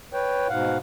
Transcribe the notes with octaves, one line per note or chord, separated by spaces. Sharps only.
B4 C#5 G5
G#2 B2 F5 F#5